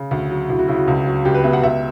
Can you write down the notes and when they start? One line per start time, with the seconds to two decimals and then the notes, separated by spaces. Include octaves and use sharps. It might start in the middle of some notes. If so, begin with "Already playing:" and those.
Already playing: C#3
0.11 D2
0.31 F#3
0.49 D2 E4
0.59 F#4
0.68 C#3 E4
0.78 F#4
0.87 C#2
1.06 F#3
1.25 C#2 G4
1.34 B4
1.44 B2 E5
1.53 F#5
1.63 C#2 E5